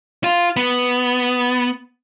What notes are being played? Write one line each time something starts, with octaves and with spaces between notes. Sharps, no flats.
F4
B3